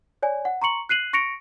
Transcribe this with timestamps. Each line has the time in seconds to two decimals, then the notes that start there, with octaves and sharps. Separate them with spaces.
0.23 C#5 D5 G#5
0.45 F#5
0.62 A#5 C6 C#6 C#7 F#7
0.89 F#6 C7 D#7 F#7
1.13 C#6 A#6 C#7 D7 F7